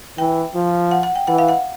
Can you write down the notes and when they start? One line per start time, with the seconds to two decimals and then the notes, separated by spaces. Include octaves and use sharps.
0.18 E3 G5
0.55 F3
0.91 F#5
1.03 F#5
1.16 G5
1.27 E3 F#5
1.38 F5
1.49 F#5